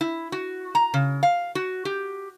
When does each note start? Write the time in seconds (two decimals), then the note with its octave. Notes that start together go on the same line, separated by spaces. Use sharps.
0.01 E4
0.32 F#4
0.75 A#5
0.94 C#3
1.23 F5
1.55 F#4
1.85 G4